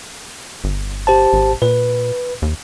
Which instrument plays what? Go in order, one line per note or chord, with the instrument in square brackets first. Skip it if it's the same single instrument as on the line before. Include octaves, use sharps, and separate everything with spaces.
[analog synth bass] G1
[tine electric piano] G4 C5 A5
[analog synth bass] G#1
[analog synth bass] A#2 [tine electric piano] B4
[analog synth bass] D#2